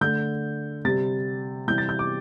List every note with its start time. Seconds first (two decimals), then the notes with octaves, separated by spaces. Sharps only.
0.01 D3 A3 G6
0.85 C3 G3 A6
1.68 C3 E3 G3 G6
1.78 A6
1.89 G6
1.99 D6